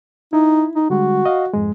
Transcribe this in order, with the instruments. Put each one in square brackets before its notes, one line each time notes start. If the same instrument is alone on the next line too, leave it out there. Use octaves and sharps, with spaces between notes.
[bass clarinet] D#4 [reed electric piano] E4
[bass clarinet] D#4
[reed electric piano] D3 G3 G#3 [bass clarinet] F#4
[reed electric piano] D#5 F5
F2 G#2 G#3